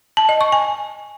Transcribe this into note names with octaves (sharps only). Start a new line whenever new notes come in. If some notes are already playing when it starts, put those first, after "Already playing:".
A5
D#5
C#6
G#5